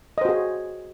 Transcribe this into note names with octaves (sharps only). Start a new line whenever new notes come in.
F#4 G#4 C5 D#5